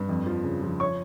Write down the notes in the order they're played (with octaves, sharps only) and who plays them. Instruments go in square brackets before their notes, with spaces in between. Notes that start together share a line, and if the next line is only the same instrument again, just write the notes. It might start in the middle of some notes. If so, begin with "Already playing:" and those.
Already playing: [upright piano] G2
F2
F3
C#3
F3
C#5 C#6